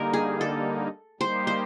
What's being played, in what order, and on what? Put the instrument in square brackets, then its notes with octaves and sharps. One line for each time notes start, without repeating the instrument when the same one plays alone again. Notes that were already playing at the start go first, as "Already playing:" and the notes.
Already playing: [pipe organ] D3 G3 A#3 D#4 [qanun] A#4
[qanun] G#4
A4
[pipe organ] G3 A#3 D#4 G4 [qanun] C5
[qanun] C5